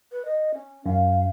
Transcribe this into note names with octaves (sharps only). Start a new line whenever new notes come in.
B4
D#5
C#4
F#2 F5